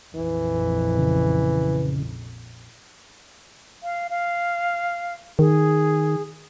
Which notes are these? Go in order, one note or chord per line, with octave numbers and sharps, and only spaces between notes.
A#1 F2 E3
C#3
F5
F5
D#3 G#4